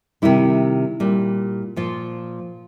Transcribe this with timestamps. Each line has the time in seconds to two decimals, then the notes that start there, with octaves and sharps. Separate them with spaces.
0.22 C3 D#3 G3 E4
1.00 A#2 G3
1.76 A#2 F3 F4